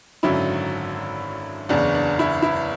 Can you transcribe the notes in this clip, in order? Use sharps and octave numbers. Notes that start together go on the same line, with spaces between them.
G#1 F#2 D3 F#3 C#4 E4
F#1 E2 C#3 D4
D4
E4
E4